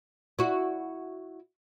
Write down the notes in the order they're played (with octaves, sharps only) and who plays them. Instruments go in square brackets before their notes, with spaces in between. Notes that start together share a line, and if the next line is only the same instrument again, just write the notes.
[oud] E4 F#4